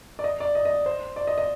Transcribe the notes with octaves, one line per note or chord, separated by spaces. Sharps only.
D5
D#5
D5
D#5
D#5
C5
D5
D#5
D#5